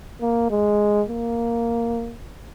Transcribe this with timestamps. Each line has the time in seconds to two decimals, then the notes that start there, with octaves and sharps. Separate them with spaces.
0.21 A#3
0.50 G#3
1.09 A#3